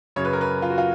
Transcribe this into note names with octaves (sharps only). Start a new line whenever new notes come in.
F#2 C#3 F#3 C#5
B4
A#4
B4
F4
F#4
F4